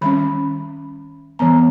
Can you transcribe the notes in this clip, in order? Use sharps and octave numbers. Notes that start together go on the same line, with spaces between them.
D#3 G3 C#4 B5
E3 G3 B3 A#5